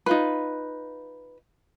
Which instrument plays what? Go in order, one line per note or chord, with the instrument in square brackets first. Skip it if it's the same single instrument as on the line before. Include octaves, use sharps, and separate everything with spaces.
[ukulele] D#4 F4 B4